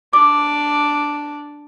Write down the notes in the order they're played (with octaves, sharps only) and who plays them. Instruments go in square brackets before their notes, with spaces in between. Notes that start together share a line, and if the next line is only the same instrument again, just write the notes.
[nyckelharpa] D4 D5 [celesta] D6